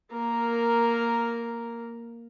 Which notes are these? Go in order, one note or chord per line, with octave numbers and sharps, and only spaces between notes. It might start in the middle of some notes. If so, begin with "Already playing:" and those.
A#3 A#4